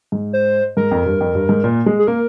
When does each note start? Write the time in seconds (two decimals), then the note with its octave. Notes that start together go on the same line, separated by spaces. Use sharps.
0.12 G#2
0.33 C5
0.77 G#2 A#4
0.91 F2
1.06 G2
1.21 F2
1.35 G2
1.49 G#2
1.64 A#2
1.86 G#3
1.99 G#4
2.07 A#3 A#4